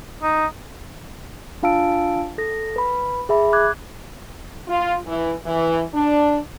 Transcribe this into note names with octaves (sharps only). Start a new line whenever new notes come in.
D#4
D4 F4 F5 A5 E6 D7
A4 A#6
B4 B5
G#4 E5 B5
D6 F#6 G#6
F4
E3
E3
D4